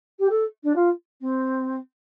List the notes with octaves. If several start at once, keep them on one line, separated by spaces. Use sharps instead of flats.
G4
A4
D4
F4
C4